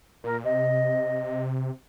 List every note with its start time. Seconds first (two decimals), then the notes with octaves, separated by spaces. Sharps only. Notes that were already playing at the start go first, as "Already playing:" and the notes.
0.24 A#2 A#4
0.44 C3 D#5